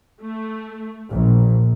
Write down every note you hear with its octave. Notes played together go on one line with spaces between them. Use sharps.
A3
A#1